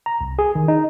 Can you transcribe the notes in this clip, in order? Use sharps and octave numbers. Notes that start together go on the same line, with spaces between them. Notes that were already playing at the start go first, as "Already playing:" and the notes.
A#5
C2
G#4
D#3
D#4